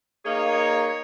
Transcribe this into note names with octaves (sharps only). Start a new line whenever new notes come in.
A#3 D#4 G#4 C#5